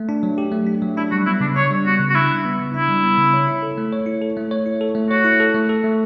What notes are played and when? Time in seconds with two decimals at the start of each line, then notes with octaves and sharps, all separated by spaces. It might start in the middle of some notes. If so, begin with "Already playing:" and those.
Already playing: A3
0.09 D4
0.23 F#3
0.38 G4
0.52 A3
0.67 D4
0.82 F#3
0.97 D4 E4
1.11 G3 F#4
1.26 B3 E4
1.40 C#3 D4
1.56 D4 C#5
1.71 G3
1.85 B3 F#4
2.00 C#3
2.09 F#4
2.15 D4 E4
2.29 G3
2.45 B3
2.60 C#3
2.74 D4 E4
2.88 G3
3.03 B3
3.18 C#3
3.34 C#5
3.48 E4
3.63 A4
3.78 A3
3.93 C#5
4.06 E4
4.22 A4
4.37 A3
4.51 C#5
4.66 E4
4.81 A4
4.95 A3
5.10 F#4 C#5
5.24 E4
5.40 A4
5.54 A3
5.69 A4
5.84 A3